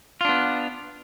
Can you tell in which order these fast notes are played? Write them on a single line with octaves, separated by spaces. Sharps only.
F4 D4 B3